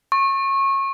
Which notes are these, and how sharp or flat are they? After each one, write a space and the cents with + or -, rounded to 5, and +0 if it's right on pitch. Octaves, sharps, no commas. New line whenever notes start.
C#6 -25